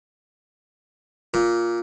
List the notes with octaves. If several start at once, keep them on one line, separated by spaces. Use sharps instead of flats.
A#2